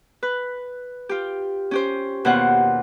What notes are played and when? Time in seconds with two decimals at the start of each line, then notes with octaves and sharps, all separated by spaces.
0.23 B4
1.09 F4 G4
1.71 C#4 G4 C5
2.25 D#2 B2 F4 C5 C#5 F#5